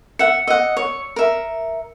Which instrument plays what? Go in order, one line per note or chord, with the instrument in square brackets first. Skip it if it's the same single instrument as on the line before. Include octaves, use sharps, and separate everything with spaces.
[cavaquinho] E5 F#5 [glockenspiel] C#7
[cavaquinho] D#5 F#5 [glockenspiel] E6
[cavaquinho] C#5
A#4 E5